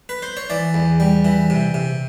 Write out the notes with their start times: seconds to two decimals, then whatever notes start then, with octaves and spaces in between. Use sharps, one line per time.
0.09 B4
0.22 C5
0.37 C#5
0.50 E3 D5
0.74 E2
1.00 G3
1.25 E3
1.50 C3
1.74 C3